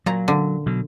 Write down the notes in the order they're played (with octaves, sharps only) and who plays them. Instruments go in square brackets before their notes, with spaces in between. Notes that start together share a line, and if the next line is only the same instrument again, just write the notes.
[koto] A#2 A#5 [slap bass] F#3
[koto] D3
[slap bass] B2 F#3